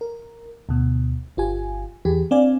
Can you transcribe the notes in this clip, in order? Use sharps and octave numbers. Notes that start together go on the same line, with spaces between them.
A#4
D2 B2
G1 F4 G4 G#5
E2 E3 G4 G#4
C4 D4 D5 F5 G#5